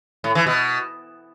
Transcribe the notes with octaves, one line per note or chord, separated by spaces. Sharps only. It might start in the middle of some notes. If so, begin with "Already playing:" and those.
A2
E3
B2